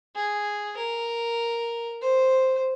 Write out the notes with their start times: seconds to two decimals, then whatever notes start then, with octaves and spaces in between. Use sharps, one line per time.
0.16 G#4
0.77 A#4
2.02 C5